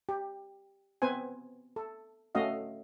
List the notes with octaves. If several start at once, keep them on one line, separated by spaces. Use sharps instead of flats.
G4
B3 C4 B4 C5 G#5
A4
A3 C#4 F#4 D#5 F5